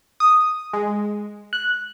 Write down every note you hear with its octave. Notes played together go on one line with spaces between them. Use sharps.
D#6
G#3
F#6